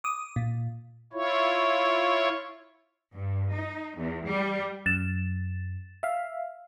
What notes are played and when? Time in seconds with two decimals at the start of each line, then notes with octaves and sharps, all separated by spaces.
0.04 D6 D#6
0.36 A#2
1.13 E4 F4 C#5
3.12 G2
3.51 D#4
3.96 E2
4.26 G3
4.86 F#2 A6 E7
6.03 E5 F5